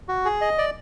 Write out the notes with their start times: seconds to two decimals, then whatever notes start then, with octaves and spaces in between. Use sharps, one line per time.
0.08 F#4
0.25 G#4
0.41 D#5
0.58 D5